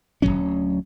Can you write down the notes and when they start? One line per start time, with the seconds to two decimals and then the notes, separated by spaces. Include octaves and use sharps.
0.22 D1 F#2 F#3 C#4